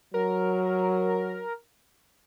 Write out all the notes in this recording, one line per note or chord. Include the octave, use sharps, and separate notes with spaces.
F#3 A#4